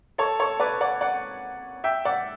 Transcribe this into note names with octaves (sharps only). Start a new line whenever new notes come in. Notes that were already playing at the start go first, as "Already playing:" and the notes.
A4 C#5
A4 C#5
B4 D5
D5 F#5
D5 F#5
E5 G5
D5 F#5